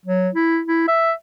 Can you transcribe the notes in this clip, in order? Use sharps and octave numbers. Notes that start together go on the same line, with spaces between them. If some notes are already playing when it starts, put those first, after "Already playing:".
F#3
E4
E4
E5